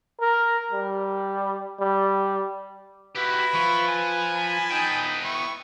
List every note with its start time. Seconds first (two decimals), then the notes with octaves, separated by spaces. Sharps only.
0.21 A#4
0.72 G3
1.80 G3
3.16 E4 F#4 G4 B4 B5
3.54 F3 F4 C#6
3.88 G#5
4.35 A#4 A5 B5
4.71 B3 D#4 G5
5.24 E4 C#6